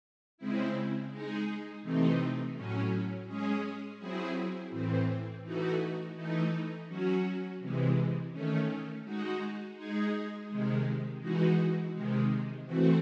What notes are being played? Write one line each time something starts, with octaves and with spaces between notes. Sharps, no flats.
C#3 G#3 C4 E4
G#3 D#4 G#4
C3 E3 A3 C4 D#4
A2 F#3 C#4
G#3 C#4 G#4
F#3 C4 E4 G#4
A2 E3 C4
E3 A3 D#4 F#4
E3 A3 D#4
F#3 C#4 F#4
C3 E3 G#3
D#3 A3 C#4
G#3 D#4 F#4
G#3 D#4 G#4
C3 D#3 G#3
E3 G#3 D#4 F#4
C3 D#3 G#3
E3 A3 C4 F#4